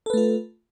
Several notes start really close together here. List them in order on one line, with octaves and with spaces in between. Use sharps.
A4 B4 A3 F4